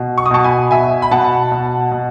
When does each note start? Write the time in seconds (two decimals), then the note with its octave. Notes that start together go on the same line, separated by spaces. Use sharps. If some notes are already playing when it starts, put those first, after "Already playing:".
Already playing: B2
0.18 C#6
0.26 D#6
0.31 B2 A5 C#6
0.44 G#5 B5
0.71 B2 E5 G#5
1.02 B5
1.11 B2 F#5 A5
1.52 B2
1.92 B2